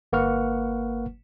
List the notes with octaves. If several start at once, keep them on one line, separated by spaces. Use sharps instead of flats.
G1 A#3 B4 F#5 C#6 F6